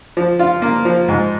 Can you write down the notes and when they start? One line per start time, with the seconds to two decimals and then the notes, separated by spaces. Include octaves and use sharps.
0.17 F3
0.39 F4
0.62 A#3
0.85 F3
1.08 G#2